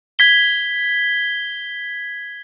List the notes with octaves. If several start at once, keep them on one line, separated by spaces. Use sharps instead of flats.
G#6 B6 G7